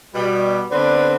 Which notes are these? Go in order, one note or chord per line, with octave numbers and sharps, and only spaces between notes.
B2 G3
D3 B3 C4 B4 D5